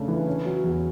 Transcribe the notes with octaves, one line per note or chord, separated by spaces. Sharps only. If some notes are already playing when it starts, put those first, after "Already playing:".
Already playing: C#3 A3 D4
E3
C#4
F#3
E2